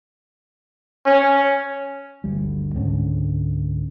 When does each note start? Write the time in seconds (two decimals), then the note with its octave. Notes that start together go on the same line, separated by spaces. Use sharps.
1.06 C#4
2.24 G1 D2 G3
2.74 C#2 G#2 D3 C#4